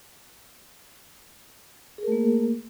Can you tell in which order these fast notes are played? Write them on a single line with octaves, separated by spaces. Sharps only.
G#4 A#4 A3 A#3